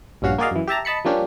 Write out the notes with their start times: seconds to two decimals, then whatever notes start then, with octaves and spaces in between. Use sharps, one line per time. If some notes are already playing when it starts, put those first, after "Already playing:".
0.22 A#1 G2 C#4 F#4 F5
0.39 A#3 F#4 G#4 D5 D#5 F5
0.51 F#2 E3
0.68 G4 E5 A5 A#5
0.85 D#5 A5 B5 C#7
1.05 F3 G3 A#3 C#4 D4 G4